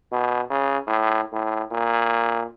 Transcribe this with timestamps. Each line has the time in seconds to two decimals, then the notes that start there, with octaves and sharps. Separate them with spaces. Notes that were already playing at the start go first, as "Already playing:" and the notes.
0.12 B2
0.50 C#3
0.87 A2
1.32 A2
1.72 A#2